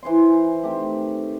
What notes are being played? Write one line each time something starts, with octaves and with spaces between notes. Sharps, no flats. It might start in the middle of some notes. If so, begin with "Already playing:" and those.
E3 C5 G#5 C6
D#3 A3 C4 G4